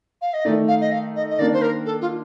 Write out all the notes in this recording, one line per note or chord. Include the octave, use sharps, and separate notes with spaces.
F5
D#5
D#3 A3 D#4 D5
F5
D#5
F5
D#5
D#5
D#3 A#3 D4 D5
C5
A#4
A4
F4